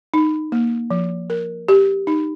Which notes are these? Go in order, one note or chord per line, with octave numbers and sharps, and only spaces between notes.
D#4
A#3
F3
A#4
G4
D#4